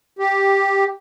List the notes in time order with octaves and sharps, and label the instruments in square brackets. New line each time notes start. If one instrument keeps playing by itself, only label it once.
[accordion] G4